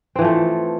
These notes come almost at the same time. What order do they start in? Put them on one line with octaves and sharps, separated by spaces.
C4 E3 F3 A3